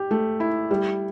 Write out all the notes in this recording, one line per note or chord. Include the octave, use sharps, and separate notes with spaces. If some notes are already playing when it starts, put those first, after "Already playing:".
Already playing: G4
A3
E4
G3